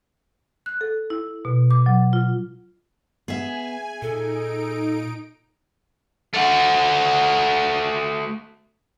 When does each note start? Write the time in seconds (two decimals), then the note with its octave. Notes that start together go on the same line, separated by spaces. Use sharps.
0.66 F#6
0.81 A4
1.10 E4
1.45 B2
1.71 D6
1.86 F#3
2.13 F4
3.28 B3 G#4 E5 G#5
4.02 A#2 D#4 A4 D7
6.33 A3 F#4